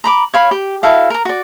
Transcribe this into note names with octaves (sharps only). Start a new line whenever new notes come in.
A#5 B5 D6
C#5 F5 B5
G4
E4 F#4 A4 F5
A#4 A#5
F#4 D5